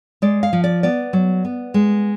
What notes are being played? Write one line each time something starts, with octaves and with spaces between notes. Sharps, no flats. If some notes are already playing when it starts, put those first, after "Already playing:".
G#3 D5
F5
F3
D5
B3 D5
F#3
B3
G#3